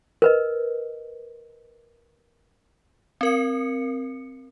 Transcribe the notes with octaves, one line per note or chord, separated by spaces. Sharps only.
A#4 B4 D#5
C4 A#4 C#7